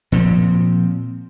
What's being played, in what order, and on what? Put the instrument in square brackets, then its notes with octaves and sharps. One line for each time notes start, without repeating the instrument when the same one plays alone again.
[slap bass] A#2 F3 C4